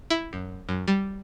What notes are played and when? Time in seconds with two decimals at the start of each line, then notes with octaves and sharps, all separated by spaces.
0.10 E4
0.33 F#2
0.69 F#2
0.88 G3